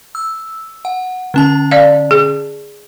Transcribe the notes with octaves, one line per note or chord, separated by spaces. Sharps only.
E6
F#5
D3 C#4 A5
D5 F5
G#4